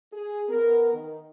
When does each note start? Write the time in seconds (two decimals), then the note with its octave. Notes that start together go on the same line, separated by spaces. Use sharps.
0.13 G#4
0.49 B3 A#4
0.93 D#3